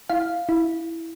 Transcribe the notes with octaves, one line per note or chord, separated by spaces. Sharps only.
E4 F5
E4